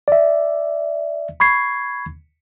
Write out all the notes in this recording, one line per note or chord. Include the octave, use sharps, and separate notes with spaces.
D5 E5
B5 C#6 G#6 C7